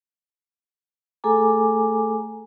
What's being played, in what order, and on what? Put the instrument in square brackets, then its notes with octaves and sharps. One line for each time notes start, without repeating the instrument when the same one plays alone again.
[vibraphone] A3 G#4 A4 G#5 A#5 D6